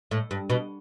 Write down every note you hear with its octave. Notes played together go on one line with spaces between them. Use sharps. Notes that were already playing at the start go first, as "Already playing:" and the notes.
A2
G2
B2